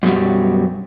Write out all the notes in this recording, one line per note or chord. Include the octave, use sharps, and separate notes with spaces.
F#2 B2 F#3 G3